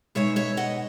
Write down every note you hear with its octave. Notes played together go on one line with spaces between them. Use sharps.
B2 G#3 D#4 C#5 E5
C#5 E5
D#5 F#5